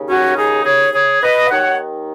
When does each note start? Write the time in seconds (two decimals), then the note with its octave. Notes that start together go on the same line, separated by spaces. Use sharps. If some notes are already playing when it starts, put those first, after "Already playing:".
Already playing: D#2 C#3
0.09 C#4 F#4
0.37 D#4 G#4
0.65 G#4 C#5
0.94 G#4 C#5
1.22 B4 D#5
1.50 D#2 D#3 C#5 F#5